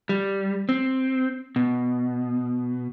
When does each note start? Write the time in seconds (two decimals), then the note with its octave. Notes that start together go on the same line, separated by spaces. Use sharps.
0.09 G3
0.69 C4
1.56 B2